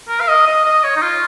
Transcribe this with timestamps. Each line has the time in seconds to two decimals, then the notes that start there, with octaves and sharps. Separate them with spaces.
0.08 A#4
0.20 F5
0.28 D#5
0.46 D#5
0.65 D#5
0.84 C#5
0.96 D#4
1.02 F4